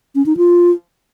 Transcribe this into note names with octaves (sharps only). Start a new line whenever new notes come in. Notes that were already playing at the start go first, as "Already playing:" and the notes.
C#4
D#4
F4